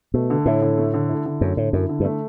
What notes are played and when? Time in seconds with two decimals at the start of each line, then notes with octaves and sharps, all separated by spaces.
0.14 B2 A3
0.30 D3
0.46 A2 E4
0.62 D3
0.78 A3
0.94 D3
1.09 E4
1.26 D3
1.41 F#2 A3
1.57 A2 D3
1.73 F#2 E4
1.89 D3
2.00 G2
2.05 A3